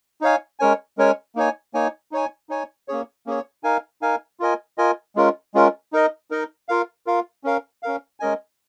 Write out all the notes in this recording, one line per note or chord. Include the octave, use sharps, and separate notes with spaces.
D#4 C#5 F5 G#5
G#3 C#4 A#4 C#5 G#5
G#3 C#4 A#4 C#5 G#5
A#3 D#4 C#5 G#5
A#3 D#4 C#5 G#5
D#4 C#5 G#5
D#4 C#5 G#5
A#3 C#4 G#4 C#5
A#3 C#4 G#4 C#5
D#4 A#4 F5 G#5
D#4 A#4 F5 G#5
F4 A#4 D#5 G#5
F4 A#4 D#5 G#5
G#3 C#4 F4 A#4
G#3 C#4 F4 A#4
D#4 A#4 D#5
D#4 A#4 D#5
F4 A#4 F5
F4 A#4 F5
C#4 A#4 F5
C#4 A#4 F5
G#3 C#4 A#4 D#5 G#5